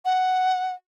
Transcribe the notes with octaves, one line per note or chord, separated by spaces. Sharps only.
F#5